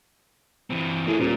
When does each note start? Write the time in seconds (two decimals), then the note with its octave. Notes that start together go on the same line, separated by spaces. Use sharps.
0.70 E3 C4
1.07 A2 A#3 G#4
1.19 D#1 A#2